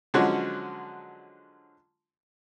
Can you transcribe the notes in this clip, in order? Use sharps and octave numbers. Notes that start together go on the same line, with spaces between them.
D3 F3 F#3 G#3 C#4 F#4